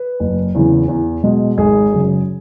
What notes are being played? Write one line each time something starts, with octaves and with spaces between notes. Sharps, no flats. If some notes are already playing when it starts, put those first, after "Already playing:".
Already playing: B4
F#1
E2 C#3 E3
E2
B2 G#3
G#1 G#4
F#2 C#3